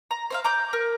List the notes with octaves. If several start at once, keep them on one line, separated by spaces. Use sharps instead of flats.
A#5
C5 E5 F5
A#5 D6 G6
A#4